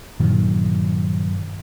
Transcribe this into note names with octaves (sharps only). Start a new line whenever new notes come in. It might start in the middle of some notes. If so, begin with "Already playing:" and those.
G2 A#2 D#3 F#3